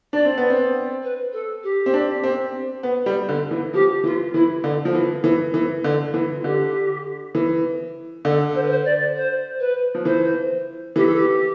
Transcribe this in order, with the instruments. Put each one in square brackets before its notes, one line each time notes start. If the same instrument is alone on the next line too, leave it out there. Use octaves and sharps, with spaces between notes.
[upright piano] D4 [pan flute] D5
[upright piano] C4
B3
C4
[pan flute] B4
A4
G4
[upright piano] C4
D4
C4
B3
G3
D3
E3
[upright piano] F3 [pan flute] G4
[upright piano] E3 [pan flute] F4
[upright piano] E3 [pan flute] E4
[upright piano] D3
F3
E3
E3
E3
D3
E3
[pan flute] F4
[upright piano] D3 [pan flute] G4
[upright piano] E3
[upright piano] D3 [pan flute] A4
[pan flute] C5
B4
C5
D5
C5
B4
[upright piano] F3
[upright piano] E3 [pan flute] C5
[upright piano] E3 [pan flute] G4
[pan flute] A4
G4